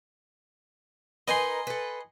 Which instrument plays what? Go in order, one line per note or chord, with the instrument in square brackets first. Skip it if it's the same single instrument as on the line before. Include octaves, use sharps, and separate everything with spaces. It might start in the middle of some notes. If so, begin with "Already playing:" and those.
[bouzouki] D#4 A#4 B4 [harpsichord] D#5 G#5 C6
[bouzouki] A4 B4